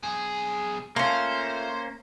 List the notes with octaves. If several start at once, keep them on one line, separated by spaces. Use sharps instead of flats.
B1 G#4
A3 A#3 C#4 F4 C5